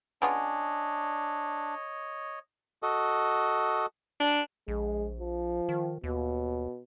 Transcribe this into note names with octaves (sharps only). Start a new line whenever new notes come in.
C#3 B3 D4 F4 C#5 D#5 G#5
F#4 A4 D#5
D4
A#1 G#3
F3
D#3
D#2 B2